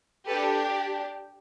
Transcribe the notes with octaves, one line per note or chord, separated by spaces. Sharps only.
D4 G4 A4 B4